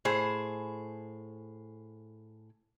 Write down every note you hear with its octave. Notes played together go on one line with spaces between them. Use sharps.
A2 G#4 C5